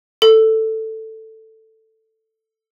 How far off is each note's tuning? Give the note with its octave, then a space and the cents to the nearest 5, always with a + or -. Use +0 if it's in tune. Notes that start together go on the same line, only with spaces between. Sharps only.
A4 +10